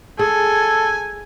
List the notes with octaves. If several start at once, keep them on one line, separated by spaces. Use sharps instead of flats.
G#4 A4 G#5